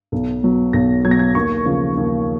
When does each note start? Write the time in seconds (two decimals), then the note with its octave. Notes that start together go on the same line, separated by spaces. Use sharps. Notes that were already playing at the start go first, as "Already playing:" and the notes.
0.12 B1
0.43 B2 F#3
0.73 B1 A#6
1.05 F#3 G#6
1.08 B2 A#6
1.19 G#6
1.35 D#2 C#6
1.65 C#3 F3
1.97 D#2